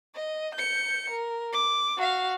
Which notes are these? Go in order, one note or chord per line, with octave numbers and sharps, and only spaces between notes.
D#5
G6 C#7
A#4
D6
F#4 F5